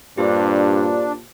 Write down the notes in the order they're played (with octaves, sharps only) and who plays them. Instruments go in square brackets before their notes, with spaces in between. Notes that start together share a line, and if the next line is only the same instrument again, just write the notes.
[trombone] G2 [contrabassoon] A#2 [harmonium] D4 [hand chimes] G4 C5